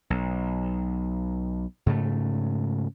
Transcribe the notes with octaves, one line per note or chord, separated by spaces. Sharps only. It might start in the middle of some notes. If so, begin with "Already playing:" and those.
B1
G#2 C#3 A3